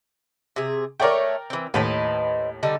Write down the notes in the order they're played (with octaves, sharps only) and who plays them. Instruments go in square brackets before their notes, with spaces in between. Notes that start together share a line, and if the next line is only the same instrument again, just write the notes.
[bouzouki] C3 G#4
[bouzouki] A3 C#5 [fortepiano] A#4 D5 G5
[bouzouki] E3 C4
[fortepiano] D#2 A2 [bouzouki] B4 C5 D#5
[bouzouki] D3 G3 D#4